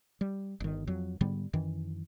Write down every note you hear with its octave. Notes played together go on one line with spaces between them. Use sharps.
G3
G1 D#3
F2 F#3
G#2 D3 G3 B3
F#2 D#3 E3